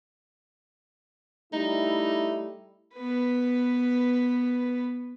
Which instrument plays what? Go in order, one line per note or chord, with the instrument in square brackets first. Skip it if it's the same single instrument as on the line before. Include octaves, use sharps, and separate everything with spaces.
[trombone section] G3 A3 E4 [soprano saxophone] D#4
[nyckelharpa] B3 B4